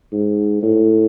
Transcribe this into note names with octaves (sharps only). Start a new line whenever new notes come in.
G#2
A2